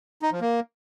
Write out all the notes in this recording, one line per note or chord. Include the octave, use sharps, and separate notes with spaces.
D#4
F3
A#3